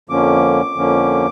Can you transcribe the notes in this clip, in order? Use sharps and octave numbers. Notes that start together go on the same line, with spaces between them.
F2 D3 F3 A#3 C#4 D6
F2 D3 F3 A#3 C#4